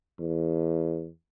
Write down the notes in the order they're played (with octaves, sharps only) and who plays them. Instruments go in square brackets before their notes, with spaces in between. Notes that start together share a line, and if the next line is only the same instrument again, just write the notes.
[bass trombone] E2